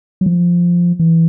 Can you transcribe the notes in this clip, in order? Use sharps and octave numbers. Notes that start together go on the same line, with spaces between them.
F#3
F3
E3